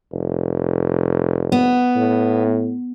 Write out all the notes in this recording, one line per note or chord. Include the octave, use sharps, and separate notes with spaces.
F1
B3
A2